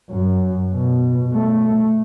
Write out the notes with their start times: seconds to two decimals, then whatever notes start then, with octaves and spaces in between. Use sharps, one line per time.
0.10 F#2
0.74 B2
1.33 A3